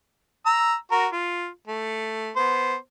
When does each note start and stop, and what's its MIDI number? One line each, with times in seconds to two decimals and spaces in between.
0.46 0.75 82
0.46 0.75 88
0.92 1.07 66
0.92 1.07 70
1.12 1.47 65
1.67 2.30 57
2.36 2.75 59
2.36 2.75 72